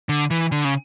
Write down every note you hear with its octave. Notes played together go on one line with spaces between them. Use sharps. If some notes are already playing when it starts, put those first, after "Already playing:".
D3
E3
D3
C#3